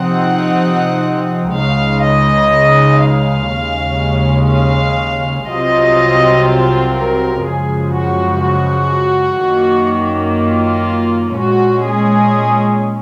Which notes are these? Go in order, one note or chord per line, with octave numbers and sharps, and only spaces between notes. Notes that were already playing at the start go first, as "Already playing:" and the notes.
Already playing: C3 F3 C4 D#4 F#5
C#2 C#3 G#3 D#4 F5
D#5
F5
D#2 C#3 G#3 C#4
F5
C2 C3 F#3 C4 F4 D#5
C5
A#4
F#2 C#3 F3 G#3 G#4
F#4
F#4
F#2 D#3 A#3
F4
A#2 G#3 C#4 F#4
G#4